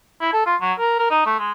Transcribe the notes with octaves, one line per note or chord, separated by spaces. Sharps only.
E4
A4
F4
F#3
A#4
A#4
D#4
A3
G#3